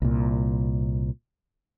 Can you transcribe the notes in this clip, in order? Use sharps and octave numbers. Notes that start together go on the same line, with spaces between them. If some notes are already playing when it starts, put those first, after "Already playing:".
C2 A#2